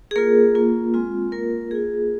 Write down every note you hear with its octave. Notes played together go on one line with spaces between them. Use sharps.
G#4
A#3 F4 A#4
A#3 F4
G#3 C4 F4
A#3 F4 A#4
A#3 F4 G#4